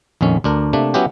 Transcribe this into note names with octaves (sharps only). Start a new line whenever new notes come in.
A#1 F2 D#3 C#4
D2 D4 A#4
C3 A3 A#3 D4
F#3 B3 C#4 E4 F#4 G4